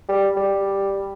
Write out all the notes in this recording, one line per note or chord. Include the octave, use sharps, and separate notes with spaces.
G3
G3